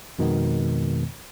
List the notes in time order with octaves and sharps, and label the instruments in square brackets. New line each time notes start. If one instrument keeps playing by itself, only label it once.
[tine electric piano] F2 B2 D#3 G#3 B3